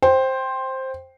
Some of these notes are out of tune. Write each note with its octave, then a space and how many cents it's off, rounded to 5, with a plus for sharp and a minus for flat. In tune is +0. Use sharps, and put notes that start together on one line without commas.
C5 +10 G5 +0